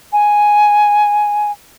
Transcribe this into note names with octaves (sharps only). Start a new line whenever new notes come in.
G#5